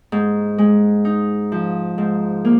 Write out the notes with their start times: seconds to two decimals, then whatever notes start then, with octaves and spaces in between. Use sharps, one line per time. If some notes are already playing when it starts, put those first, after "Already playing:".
0.12 G#2
0.58 G#3
1.05 D#4
1.52 F3
1.98 G#2
2.45 A#3